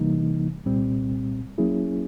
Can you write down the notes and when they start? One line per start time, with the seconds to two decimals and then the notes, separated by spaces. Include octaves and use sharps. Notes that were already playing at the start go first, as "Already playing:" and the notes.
Already playing: C3 E3 G3 A#3 D#4
0.66 C2 A#2 G3 C4
1.58 F#3 A#3 C#4 E4 G#4